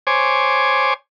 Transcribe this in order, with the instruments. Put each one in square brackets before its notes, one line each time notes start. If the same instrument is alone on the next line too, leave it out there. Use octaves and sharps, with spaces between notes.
[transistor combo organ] C5 C#5 G#5 D6